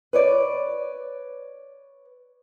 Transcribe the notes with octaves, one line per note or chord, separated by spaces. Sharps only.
B4 C#5 D5